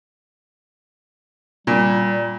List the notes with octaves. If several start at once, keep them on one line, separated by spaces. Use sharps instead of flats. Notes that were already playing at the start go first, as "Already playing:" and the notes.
A#2 G3